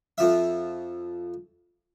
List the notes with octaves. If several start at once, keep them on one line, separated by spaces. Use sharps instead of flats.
F2 F3 E5